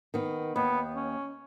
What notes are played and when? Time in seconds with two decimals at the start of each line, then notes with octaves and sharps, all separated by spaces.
0.14 D#3 B3
0.56 D#2 B3
0.95 C#4